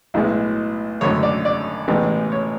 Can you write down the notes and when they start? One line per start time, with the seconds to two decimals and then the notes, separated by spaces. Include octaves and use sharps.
0.14 B1 A2 G#3 B3 E4
1.01 G#1 F#2 D3 A3 C#5
1.23 D5
1.45 D5
1.88 A1 A2 E3 G#3 B3
2.32 C#5